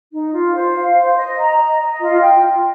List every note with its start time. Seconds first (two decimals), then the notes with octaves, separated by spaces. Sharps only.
0.13 D#4
0.34 F4
0.55 C5
0.75 F5
0.96 C5
1.18 D#5
1.38 A#5
1.59 D#5
1.80 D#5
2.00 F4
2.21 G5
2.42 F4